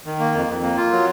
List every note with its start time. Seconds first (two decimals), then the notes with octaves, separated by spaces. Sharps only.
0.06 D#3
0.20 A#3
0.34 F2
0.48 F2
0.63 A#3
0.77 F4
0.91 F#3